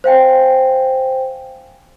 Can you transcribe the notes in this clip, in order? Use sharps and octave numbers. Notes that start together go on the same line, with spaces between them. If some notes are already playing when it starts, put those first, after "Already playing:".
C5 F5 G5 G#5